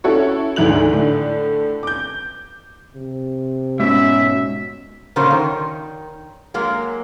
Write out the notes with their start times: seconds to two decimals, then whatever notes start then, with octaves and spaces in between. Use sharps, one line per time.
0.04 C#4 E4 F#4 A4 C#5
0.56 D2 G#2 E3 E4 F#6 F#7
0.92 A2 D3
1.83 D6 G6
2.96 C3
3.80 G#2 B2 C#4 E5
5.16 A#2 C#3 F#3 C#4 A#4 C5
5.31 D#3
6.54 F#3 G#3 A#3